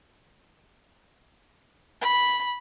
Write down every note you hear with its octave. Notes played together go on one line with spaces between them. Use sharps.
B5